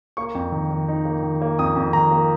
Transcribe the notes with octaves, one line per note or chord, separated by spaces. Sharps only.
A#3 C#6
F2
D#3
D#3
D#4
A#3
D#3
A#3
F2 D#6
F2
D#3 A#5
A#3